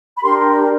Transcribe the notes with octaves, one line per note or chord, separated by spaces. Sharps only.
B5
D4 G4 A#4 C6